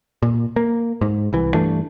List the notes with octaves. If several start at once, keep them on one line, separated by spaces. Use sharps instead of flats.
A#2
A#3
G#2
C2 E3
G2 E3 A3 D4